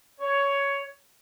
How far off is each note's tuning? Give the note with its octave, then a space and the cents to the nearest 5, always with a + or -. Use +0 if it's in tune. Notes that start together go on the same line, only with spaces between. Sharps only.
C#5 +10